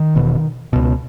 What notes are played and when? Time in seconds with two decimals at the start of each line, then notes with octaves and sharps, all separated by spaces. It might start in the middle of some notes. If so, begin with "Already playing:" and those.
Already playing: D#3
0.15 E1 E2 B2
0.73 C#2 B2